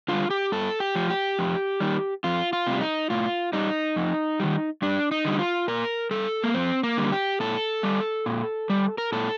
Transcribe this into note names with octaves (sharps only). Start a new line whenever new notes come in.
D3 G3 F4
G4
G2 A4
G4
F3
G4
F2
D#3 G3
F2 F4
F4
C3 G3
D#4
A2 F4
G3 D#4
F2
D#3 G3
G2 D4
D#4
D3 G3
F4
A#2 A#4
G3 A4
A#3
F2 C4
A#3
D3 G3
G4
A#2 A4
G3
A#2
G3
A#4
A#2 A4